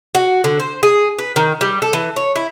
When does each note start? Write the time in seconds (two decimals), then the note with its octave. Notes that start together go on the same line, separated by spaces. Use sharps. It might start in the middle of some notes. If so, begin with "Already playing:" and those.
0.15 F#4
0.44 D3
0.60 C5
0.83 G#4
1.19 B4
1.36 D#3
1.61 G3
1.82 A4
1.93 E3
2.16 C#5
2.36 E4